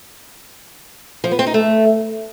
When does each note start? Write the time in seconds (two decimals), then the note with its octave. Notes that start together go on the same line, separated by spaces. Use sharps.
1.24 F3
1.31 B3
1.39 C4
1.46 D#4
1.54 A3